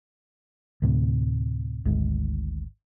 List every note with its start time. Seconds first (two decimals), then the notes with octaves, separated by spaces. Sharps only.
0.82 D2 A2 C3
1.85 G#1 D2 G#2